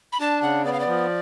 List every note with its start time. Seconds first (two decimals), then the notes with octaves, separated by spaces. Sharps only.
0.12 B5
0.20 D4 A5
0.42 C#3 F#5
0.64 B3 D5
0.73 F5
0.80 D5
0.87 F3